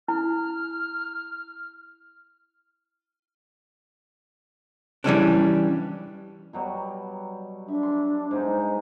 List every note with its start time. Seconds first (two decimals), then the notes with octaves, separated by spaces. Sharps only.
0.08 E4 F6
5.04 E3 G3 C#4 D4
6.53 B2 F#3 G3
7.68 D4 E5
7.83 C6
8.31 G#2 B2 D#4 C5